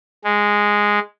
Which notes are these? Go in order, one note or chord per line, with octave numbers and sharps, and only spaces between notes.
G#3